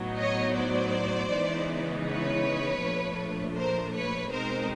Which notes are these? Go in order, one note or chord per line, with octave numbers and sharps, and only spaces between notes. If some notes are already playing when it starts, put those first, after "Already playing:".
Already playing: A2 F#3 B3 D#4
C#5 D#5
C5 D5
C#3 E3 G#3 B3 D#4
B4 C#5
A#2 F3 A3 D4
A#4 C5
B4 C#5
B2 G#3 C4 D#4 A#4 C5